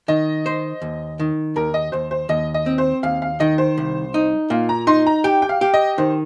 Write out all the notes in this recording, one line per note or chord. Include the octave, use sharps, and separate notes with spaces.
D#3 D#5
C5
D#2
D#3
D#2 A#4
D#5
D#2 C5
C5
D#2 D#5
D#5
C4
C5
D#2 F5
F5
D#3 D#5
C5
C2
D#4
A#2 F5
A#5
D#4 C6
A#5
G4 G5
G5
F5
G4
D#5
D#3 C5